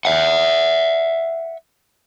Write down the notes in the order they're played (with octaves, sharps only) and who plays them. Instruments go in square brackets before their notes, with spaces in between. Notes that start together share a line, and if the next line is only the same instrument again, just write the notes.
[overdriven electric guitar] E5 F#5